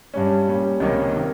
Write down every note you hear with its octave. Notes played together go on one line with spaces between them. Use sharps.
G2 G3 C#4
A#2 G3 C#4
C#2 C3 D#3 A#3 C#4
C3 D#3 A#3